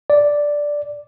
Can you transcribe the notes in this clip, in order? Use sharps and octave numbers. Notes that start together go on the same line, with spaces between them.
D5